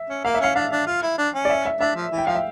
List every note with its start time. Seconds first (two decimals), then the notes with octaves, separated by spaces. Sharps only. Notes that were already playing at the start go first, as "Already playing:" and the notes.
Already playing: E5
0.10 C#4
0.25 A#3 F5
0.34 E5
0.40 C#4 F5
0.56 D4 F5
0.72 D4
0.87 F4
1.03 E4
1.18 D4
1.34 C#4
1.45 D5
1.50 E5
1.66 E5
1.81 D4 E5
1.96 F3
2.12 E3
2.18 G5
2.27 F3 F5
2.35 E5